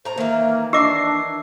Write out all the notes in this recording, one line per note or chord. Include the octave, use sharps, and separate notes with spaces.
A2 C5 A#5
D#3 E3 A#3
D4 G4 D#5 D6 E6 A#6 C7